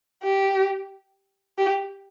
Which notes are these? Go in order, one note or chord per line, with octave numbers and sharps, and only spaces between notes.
G4
G4